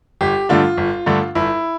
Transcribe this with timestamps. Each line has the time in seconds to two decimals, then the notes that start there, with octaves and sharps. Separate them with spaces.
0.21 G1 G4
0.49 G2 D3 A3 D4 F4
0.77 G1
1.06 G2 D3 A3 D4
1.35 G1 E4